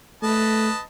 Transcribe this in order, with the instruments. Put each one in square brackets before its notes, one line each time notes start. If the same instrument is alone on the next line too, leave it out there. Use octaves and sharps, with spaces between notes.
[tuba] A3 [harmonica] B4 D#5 A5